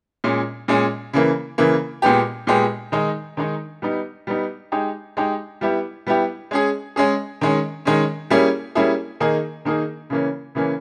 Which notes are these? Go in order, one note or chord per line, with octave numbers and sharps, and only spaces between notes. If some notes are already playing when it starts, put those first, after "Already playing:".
A#2 G#3 C#4
A#2 G#3 C#4
C#3 E3 A#3
C#3 E3 A#3
A#2 G#3 B3 G4
A#2 G#3 B3 G4
D#3 G#3 D#4
D#3 G#3 D#4
G3 B3 D#4
G3 B3 D#4
G#3 D#4 G4
G#3 D#4 G4
G3 B3 E4 G4
G3 B3 E4 G4
G#3 C#4 G#4
G#3 C#4 G#4
D#3 G#3 C#4
D#3 G#3 C#4
G3 A#3 C#4 E4 G#4
G3 A#3 C#4 E4 G#4
D#3 A#3 D#4 G#4
D#3 A#3 D#4 G#4
C#3 E3 A#3 C#4
C#3 E3 A#3 C#4